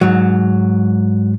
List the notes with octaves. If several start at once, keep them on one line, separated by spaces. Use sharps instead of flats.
G#2 F#3